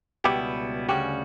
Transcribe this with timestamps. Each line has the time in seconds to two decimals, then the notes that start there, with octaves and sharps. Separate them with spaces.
0.24 C#2 B2 G3 B3 E4 G4
0.89 D2 C#3 G3 C#4 F#4 G4